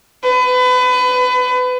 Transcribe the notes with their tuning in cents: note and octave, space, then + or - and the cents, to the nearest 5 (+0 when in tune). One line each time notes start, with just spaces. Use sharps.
B4 +30